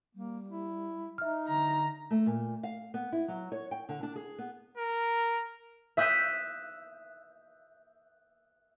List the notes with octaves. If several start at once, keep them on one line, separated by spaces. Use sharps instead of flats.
G3 A#3
E4
D#4 E5 F6
D3 A#5
A3
A#2
F5
B3
E4
F#3
C#5
G5
D3
D4
G#4
B3
A#4
E5 D#6 F#6 G6 B6 D#7